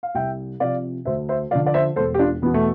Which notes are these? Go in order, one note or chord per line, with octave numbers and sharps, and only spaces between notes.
F5
C2 E5 G5
C3 F3 D5 F5
D2 C5 E5
C5 E5
D3 F3 D5 F5
D5
C5 E5
E1 A4 C5
G4
D4 F4
E2 B2 B3
A3